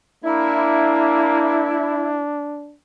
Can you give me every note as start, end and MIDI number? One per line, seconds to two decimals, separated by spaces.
0.24 1.82 58
0.24 2.75 62
0.24 2.20 64